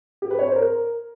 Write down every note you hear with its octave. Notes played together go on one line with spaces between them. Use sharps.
G4
B4
C#5
C5
A#4